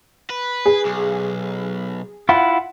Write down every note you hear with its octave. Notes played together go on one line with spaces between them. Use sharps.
B4
G#4
B1
E4 F4 F#5